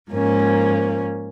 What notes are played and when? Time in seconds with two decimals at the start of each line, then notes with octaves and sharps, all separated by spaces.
0.11 G#2 F3 A#3 C#4